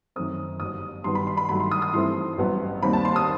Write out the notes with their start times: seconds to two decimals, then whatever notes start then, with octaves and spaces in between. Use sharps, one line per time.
0.16 F#2 D#3 A3 C4 D#6
0.60 G1 G2 F#3 D#6
1.04 G2 D#3 F#3 B3 C6
1.15 B5
1.27 C6
1.37 B5
1.49 G2 D#3 F#3 A3 B5
1.60 C6
1.71 D#6
1.82 D#6
1.93 G2 E3 A3 C4 C6
2.38 A1 G2 F#3 B3
2.82 D#2 D#3 G3 C4 B5
2.93 A5
3.05 C6
3.16 D#6